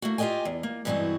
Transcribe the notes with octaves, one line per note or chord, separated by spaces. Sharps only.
A3 A#3 F#4
F4 G4 B4 D#5 G5 G#5
E2
A#3
G2 B2 E3 G#3 C4 F#4